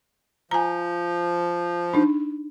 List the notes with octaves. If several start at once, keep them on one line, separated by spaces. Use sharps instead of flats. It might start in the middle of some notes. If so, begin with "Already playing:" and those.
F3 G#5 A#5
D4 D#4